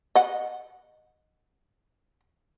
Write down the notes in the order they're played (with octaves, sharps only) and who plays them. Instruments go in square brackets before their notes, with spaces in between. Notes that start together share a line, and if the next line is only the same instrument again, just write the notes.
[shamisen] D#5 F#5